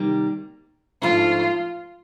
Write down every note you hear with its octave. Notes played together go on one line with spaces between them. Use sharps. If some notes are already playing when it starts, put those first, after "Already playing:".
Already playing: C3 D#3 G3 A#3
G#2 F3 A3 D4 F4